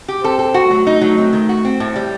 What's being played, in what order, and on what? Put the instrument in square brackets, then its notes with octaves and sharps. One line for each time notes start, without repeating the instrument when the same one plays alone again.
[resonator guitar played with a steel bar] G4
[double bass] C4 [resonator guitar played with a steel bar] A4
[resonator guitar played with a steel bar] A4
F#4
[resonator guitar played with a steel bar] F#3 [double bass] A3
[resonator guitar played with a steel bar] D#4
F#3
C4
D#3
F#4
C4
A2
G3